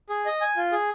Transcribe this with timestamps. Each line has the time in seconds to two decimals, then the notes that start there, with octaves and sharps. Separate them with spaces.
0.10 G#4
0.26 D#5
0.41 G#5
0.57 F4
0.72 G#4